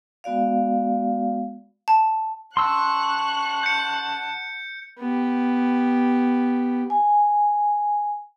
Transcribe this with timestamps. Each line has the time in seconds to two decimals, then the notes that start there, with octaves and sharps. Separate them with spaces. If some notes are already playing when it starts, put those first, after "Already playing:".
0.24 G#3 B3 F#4 D5 F5
1.88 A5
2.57 F#5 A5 C6 C#6 E6 F#6
3.63 G6 C#7
4.98 B3 G4
6.90 G#5